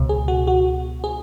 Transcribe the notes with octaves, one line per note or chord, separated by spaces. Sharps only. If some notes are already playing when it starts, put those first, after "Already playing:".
Already playing: C#2 B2
G#4
F#4
F#4
G#4